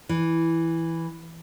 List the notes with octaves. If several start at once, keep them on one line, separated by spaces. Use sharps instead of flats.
E3